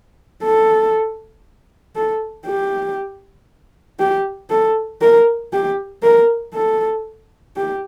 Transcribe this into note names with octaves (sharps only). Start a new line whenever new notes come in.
A4
A4
G4
G4
A4
A#4
G4
A#4
A4
G4